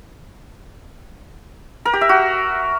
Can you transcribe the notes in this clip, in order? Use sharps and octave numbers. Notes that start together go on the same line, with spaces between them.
A#4
G4
E5
F#4